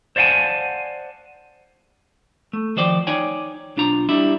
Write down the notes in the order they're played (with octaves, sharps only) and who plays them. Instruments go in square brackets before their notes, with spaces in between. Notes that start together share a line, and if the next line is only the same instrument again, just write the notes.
[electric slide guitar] C5 D5 F5 F#5 G#5 A5
[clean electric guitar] A3
D#3 F3 C5 D5 G5
D#4 C#5 D5 G5 G#5
B1 D4 F4 A#5
G3 D4 E4 G4